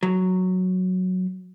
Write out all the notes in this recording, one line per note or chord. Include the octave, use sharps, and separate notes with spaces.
F#3